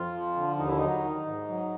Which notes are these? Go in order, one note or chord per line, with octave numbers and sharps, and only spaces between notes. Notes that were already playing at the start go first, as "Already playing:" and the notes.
Already playing: F2 F4
F3
D3
D#2 D#4
E4
F#3 D#4
D#3
G#2
F#3